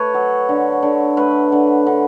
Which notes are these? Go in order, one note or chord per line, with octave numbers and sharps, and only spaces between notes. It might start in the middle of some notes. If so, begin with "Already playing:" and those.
Already playing: A3 B4 C#5
F#3
D3
D3
A3 B4
D3
D3